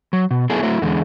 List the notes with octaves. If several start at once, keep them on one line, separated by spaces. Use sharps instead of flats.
F#3
B2
F#3 B3 E4 G#4 A4
F#3 A3 E4 F#4
E2 D3 G#3